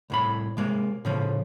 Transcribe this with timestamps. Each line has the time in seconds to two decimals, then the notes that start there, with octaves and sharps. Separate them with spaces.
0.10 C2 A2 B5
0.57 C3 G#3 A#3
1.05 A2 C#3 F3